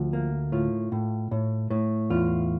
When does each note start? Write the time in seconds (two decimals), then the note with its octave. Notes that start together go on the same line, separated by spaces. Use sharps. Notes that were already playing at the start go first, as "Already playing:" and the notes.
Already playing: D2 F3
0.13 A#3
0.52 A2 F4
0.92 A2
1.31 A2
1.70 A2
2.10 E2 F4